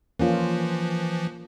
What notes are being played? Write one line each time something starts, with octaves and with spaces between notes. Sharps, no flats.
E3 F3 A#3 C#4 F4